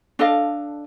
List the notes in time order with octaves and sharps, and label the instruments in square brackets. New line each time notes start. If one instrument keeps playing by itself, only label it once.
[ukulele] D4 A4 D#5 F5